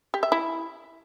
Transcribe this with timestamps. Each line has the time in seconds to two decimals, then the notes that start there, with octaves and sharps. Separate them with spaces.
0.14 G4
0.23 E5
0.32 E4